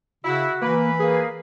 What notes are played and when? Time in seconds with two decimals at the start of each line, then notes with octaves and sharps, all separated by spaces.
0.25 C#3 E4 F#4
0.62 E3 A#3 B4
0.99 A#3 G#4